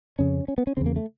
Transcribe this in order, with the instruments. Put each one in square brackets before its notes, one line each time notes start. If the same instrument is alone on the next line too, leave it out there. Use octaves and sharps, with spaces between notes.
[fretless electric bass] F2 C#3 C#4
C#4
B3
C#4
E2 C#3 C4
A#3
A3